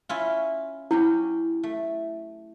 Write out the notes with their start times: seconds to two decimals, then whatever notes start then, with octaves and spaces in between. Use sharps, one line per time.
0.09 C#4 E4 F4
0.91 F#3 C#4 E4 G4
1.63 A3